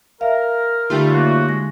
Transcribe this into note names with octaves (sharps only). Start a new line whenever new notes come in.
A#4 E5 F5
D3 G3 A3 D#4 F4 G4
F#2 A#3 F#4
G#3 A#6